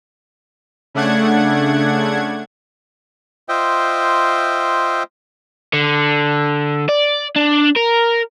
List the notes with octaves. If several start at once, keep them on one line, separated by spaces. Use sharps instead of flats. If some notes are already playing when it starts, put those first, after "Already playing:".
C#3 A3 D4 F#5 G#6
F4 C5 D#5 E5 G5
D3
D5
D4
A#4